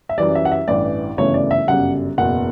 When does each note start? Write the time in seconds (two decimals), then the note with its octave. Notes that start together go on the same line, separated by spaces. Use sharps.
0.09 E5
0.18 F#2 E3 G3 D5
0.35 E5
0.45 F#5
0.52 E5
0.68 A1 G2 E3 D5
1.17 G1 F#2 C#3 E3 A3 C#5
1.34 D5
1.51 E5
1.67 G1 F#2 C#3 G3 F#5
2.18 F#1 E2 B2 F#5